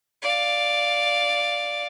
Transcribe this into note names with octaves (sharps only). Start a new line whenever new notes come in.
D5 F5